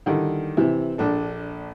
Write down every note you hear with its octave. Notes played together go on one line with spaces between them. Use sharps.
D3 D#3 G3 E4
C3 E3 E4
A#1 D4 A4